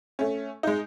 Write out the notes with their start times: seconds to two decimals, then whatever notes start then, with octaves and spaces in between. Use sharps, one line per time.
0.19 A3 C#4
0.63 G#3 D#4